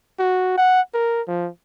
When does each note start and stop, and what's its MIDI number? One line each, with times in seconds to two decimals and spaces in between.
0.19 0.57 66
0.57 0.81 78
0.94 1.21 70
1.28 1.49 53